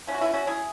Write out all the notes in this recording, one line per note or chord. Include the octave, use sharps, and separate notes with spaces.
E3 B3 C#4
F#4
B3 E4
C#4 F#4
E4 G#4